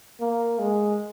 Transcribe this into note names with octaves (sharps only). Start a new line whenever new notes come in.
A#3
G#3